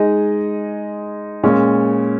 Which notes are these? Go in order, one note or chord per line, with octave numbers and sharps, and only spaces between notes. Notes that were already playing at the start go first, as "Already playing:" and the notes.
Already playing: G#3 D#4 G#4 D#5
A#2 G#3 C#4